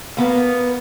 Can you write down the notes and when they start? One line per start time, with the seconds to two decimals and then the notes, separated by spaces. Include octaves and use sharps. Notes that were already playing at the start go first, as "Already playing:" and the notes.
0.17 A#3 B3